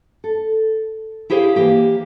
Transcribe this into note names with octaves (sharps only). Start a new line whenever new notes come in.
A4
E4 G4 G#4 C5 F5
E3 A#3 G4